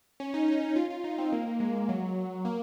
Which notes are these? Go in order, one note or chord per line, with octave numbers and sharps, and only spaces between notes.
C#4
D#4
D#4
F4
F4
D#4
C4
A#3
G#3
F#3
A#3